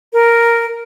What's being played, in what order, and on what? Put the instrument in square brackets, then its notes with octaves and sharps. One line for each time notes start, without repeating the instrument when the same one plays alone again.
[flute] A#4